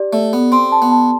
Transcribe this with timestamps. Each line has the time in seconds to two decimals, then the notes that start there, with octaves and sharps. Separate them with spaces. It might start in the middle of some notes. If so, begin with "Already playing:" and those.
Already playing: G4 D5
0.13 A3 D5
0.33 B3 A4
0.52 C4 C6
0.72 A5
0.82 B3
0.92 A5